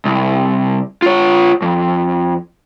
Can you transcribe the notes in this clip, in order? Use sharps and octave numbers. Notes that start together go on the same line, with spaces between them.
C2
F4 C#5
F2